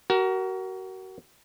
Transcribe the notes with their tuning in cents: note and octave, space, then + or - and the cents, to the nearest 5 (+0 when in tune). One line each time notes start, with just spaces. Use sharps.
F#4 +30 A#4 +0